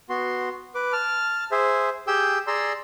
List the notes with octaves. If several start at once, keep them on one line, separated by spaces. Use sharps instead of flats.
B3 F#4 C6
B4 D6
A5 F6
G#4 C5 E5
G4 G#4 G5 E6 G6
G#4 D5 A#5 C6 E6